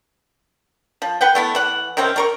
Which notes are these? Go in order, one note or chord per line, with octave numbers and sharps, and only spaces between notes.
F3
B4 F#5 G5
A3 B3 E4
E3 F#5
C3 D#3 C4 C#4
A3 A#4 C#6